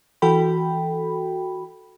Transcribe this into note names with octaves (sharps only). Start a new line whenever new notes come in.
E3 F#4 A4 G5 B5